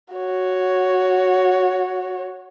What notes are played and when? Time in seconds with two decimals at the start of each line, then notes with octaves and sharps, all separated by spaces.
0.15 F#4 C#5